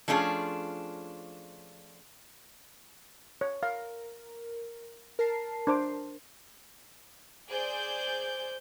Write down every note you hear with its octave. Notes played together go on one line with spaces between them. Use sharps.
F3 A3 C#4 D4 F4 G#4
C#5
A#4 F5
A#4 A5 C7
D4 C5 D6
G#4 C5 D5 G6